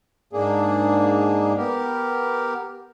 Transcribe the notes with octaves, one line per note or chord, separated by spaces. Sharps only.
G#2 A#3 D4 G#4
B3 G4 A#4